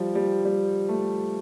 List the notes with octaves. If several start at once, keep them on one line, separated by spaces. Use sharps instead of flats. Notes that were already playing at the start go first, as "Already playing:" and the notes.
Already playing: F3 G3
G3
G3
A3